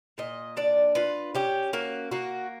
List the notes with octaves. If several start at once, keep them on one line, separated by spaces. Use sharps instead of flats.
A#2 D#5
D4 D5
F4 B4
C#4 G4
A#3 F#4
A#3 F#4